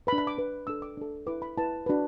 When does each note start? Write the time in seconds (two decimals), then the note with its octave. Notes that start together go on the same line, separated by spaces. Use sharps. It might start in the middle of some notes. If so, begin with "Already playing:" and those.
0.07 B4 B5
0.13 D4
0.18 B5
0.27 D6
0.37 D4 B4
0.67 D4 A4 E6
0.82 D6
0.97 D4 A4
1.27 E4 B4 D6
1.42 B5
1.58 E4 B4 A5
1.86 D4 F#4 B4